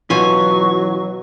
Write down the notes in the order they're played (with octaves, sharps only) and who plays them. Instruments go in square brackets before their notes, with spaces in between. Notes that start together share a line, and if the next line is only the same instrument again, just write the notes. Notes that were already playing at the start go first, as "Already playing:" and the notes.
[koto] B2 G#5 [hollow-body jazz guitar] E3 C#4 F4 [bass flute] F#3 [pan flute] C#6